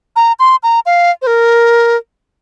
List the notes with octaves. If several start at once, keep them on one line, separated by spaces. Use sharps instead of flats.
A#5
C6
A#5
F5
C5
A#4